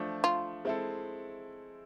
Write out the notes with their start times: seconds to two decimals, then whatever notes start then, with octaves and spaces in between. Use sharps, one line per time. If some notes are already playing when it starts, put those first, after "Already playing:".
Already playing: F3 A3 D4
0.24 F4
0.65 G#3 C4 E4 A4